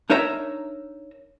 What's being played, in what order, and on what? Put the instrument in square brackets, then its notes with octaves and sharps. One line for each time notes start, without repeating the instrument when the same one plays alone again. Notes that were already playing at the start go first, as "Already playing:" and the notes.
[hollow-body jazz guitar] D4 D#4 A#4 C#5 E5 A#5